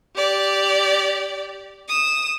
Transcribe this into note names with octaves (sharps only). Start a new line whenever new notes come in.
G4 D5
D#6 E7